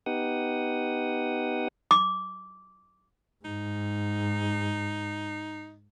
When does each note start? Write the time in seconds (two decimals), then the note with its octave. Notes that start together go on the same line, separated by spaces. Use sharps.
0.06 B3 D#4 G4 F#5 D#6
1.91 D6
3.45 G#2 D#4